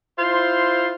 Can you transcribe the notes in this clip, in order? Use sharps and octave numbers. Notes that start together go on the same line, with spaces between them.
E4 F4 C5